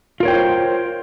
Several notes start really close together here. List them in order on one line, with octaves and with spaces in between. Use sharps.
F4 A#4 C#5 G5 C5